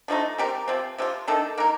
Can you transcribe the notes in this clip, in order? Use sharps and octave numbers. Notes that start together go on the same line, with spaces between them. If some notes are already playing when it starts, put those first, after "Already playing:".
D3 F3 A3 D#4
G3 C4 G4 A#4
C3 F3 C4
C3 F3 C4 F4
D#3 A3 D4 A4
A#3 D#4 A#4